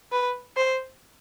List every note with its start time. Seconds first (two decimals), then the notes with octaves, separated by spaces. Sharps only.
0.12 B4
0.57 C5